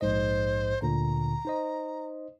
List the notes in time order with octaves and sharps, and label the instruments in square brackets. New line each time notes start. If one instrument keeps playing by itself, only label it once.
[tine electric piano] A#1 G#2 D#5 [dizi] C5
[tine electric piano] D2 A#2 D3 [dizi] A#5
[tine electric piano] D#4 C5 D#5